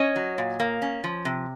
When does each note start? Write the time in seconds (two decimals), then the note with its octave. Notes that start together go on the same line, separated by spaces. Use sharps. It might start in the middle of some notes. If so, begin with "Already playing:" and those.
Already playing: C#4 C#5 D#5
0.16 F#3
0.38 A#2
0.60 A#3
0.82 C#4
1.04 F3
1.25 C3